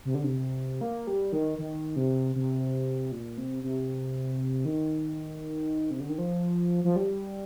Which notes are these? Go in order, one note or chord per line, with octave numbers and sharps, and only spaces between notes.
C3
D3
C3
A#3
G3
D#3
D#3
C3
C3
A#2
C3
C3
D#3
C3
D3
D#3
F3
F3
G3